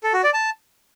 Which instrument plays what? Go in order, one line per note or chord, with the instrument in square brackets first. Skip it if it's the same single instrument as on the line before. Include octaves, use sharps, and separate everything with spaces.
[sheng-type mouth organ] A4
F#4
D5
A5